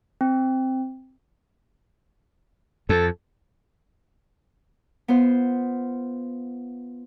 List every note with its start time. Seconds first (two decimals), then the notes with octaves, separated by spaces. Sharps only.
0.21 C4
2.89 F2 A4
5.08 B3 F4 C5